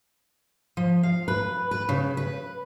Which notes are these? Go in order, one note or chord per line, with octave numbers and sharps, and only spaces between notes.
F3
F5
B4
B4
C#3
B4